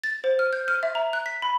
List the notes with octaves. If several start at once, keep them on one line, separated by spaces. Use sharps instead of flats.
A6
C5
F6
G6
F6
E5
A#5
F#6
B6
B5